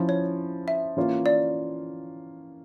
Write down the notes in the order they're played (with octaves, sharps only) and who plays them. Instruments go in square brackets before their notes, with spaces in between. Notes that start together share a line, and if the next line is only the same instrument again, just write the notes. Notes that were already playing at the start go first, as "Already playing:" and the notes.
Already playing: [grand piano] F3 C#4 E4
[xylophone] C#5
E5
[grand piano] E3 A#3 C#4 F4
[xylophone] D5